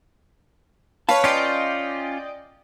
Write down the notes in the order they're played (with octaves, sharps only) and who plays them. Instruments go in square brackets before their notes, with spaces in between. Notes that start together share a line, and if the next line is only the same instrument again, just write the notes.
[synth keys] B4 C#5 [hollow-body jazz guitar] F5 A5
[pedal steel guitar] C#4 F4 [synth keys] D5 D#5 G5